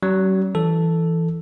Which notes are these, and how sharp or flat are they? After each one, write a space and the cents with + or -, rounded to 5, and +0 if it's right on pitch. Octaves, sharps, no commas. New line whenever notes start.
F#3 +45 C#4 +0
E3 +0 A4 +0